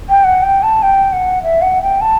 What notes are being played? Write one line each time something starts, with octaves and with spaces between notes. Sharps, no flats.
G5
F#5
G5
A5
G5
F#5
E5
F#5
G5
A5